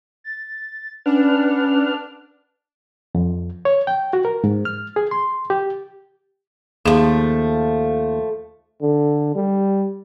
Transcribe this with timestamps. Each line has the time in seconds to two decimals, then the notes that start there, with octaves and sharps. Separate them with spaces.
0.24 A6
1.06 C#4 D4 B4 F#5 F6
3.15 F2
3.65 C#5
3.87 G5
4.13 F#4
4.25 A#4
4.44 G#2
4.65 F6
4.96 G#4
5.11 C6
5.50 G4
6.86 D#2 F3 A3 G#4
8.82 D3
9.35 G3